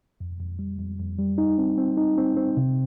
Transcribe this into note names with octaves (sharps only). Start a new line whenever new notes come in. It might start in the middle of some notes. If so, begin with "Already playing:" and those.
F2
F2
G3
F2
F2
G3
D#4
C4
C4
D#4
C4
C4
C3